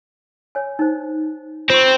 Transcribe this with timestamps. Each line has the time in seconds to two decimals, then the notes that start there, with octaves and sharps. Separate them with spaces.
0.55 C#5 G#5
0.79 D#4 C5
1.70 C4 F4 C#6